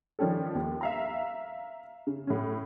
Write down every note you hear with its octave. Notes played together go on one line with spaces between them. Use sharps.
D#3 F3 G3 C#4 G4 A4
D#2
E5 F5 A#5
C#3
A2 C#4